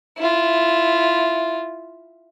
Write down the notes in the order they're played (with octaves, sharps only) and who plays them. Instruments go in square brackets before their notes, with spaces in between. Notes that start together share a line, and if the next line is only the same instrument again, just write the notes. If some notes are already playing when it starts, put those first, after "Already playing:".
[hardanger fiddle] E4 F4